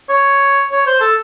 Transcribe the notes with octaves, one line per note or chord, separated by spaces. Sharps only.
C#5
C#5
C5
A4